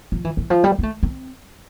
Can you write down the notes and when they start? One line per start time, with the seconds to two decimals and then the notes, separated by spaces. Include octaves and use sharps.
0.12 F3
0.25 E3
0.37 E3
0.50 F3
0.64 G3
0.79 B3
0.83 A3
1.03 C4